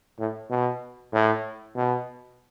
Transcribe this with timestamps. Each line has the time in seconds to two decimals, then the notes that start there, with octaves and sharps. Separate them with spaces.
0.19 A2
0.50 B2
1.13 A2
1.76 B2